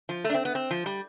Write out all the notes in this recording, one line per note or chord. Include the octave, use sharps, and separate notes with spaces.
F3
A3
D4
C4
B3
C4
F3
G3